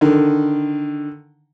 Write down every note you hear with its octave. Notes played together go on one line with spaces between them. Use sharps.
D3 D#3